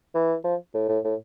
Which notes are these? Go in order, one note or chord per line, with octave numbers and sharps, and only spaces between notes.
E3
F3
A2
A2
A2